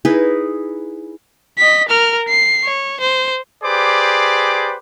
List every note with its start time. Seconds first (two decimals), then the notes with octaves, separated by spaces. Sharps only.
0.05 D#4 E4 G#4 B4
1.58 D#5 B6
1.89 A#4 F6
2.28 C7
2.64 C#5
3.01 C5
3.63 G4 G#4 B4 C5 D5 D6